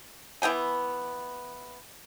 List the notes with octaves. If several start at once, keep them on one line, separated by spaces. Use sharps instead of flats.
E3 B3 G5 G#5